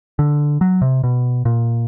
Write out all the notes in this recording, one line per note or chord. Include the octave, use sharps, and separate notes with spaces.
D3
F#3
C3
B2
A#2